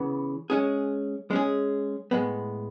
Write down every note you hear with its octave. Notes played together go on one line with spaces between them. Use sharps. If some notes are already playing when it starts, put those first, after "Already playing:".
Already playing: C#3 E3 B3
G#3 C#4 G#4
G#3 C#4 G#4
A2 G#3 B3